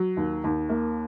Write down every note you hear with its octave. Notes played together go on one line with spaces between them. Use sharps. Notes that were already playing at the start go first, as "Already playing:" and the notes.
Already playing: F#3
D#2
D#2
A#3